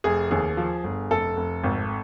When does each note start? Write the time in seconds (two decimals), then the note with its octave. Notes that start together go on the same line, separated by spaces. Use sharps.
0.04 F1 G#4
0.31 D#2 G#4
0.57 F3
0.84 G1
1.10 F1 A4
1.37 F1
1.63 G#1